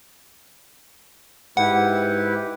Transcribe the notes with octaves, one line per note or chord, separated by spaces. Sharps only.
G#2 E4 G4 B4 F#5